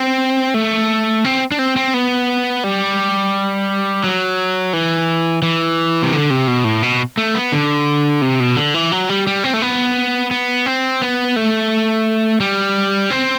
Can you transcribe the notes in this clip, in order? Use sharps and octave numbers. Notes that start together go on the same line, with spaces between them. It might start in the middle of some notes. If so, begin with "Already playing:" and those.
Already playing: C4
A3
C4
D4
C4
C4
B3
G3
F#3
E3
E3
C3
D3
C3
B2
A2
B2
A3
B3
D3
C3
B2
D3
E3
F#3
G3
G3
C4
A3
B3
B3
C4
B3
A3
G3
C4